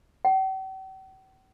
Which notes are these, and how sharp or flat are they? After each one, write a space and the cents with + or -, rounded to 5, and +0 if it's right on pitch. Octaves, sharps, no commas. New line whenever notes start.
G5 -45